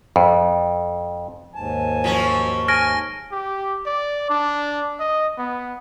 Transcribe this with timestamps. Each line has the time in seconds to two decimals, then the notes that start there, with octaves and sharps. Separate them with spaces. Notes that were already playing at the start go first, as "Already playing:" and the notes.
0.16 F2
1.55 D#2 G#2 G#5 A5
2.04 F3 F#3 C#4
2.68 G#5 F6 A#6 D7
3.32 G4
3.86 D5
4.30 D4
5.00 D#5
5.38 B3